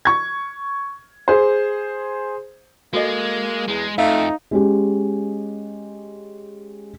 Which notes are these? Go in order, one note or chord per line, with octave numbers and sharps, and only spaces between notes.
C#6 G#6
G#4 C5
G#3 A#3 F#4 A4 D#5
E2 G#3
F2 A3 D#4 F5
G#3 C#4 G4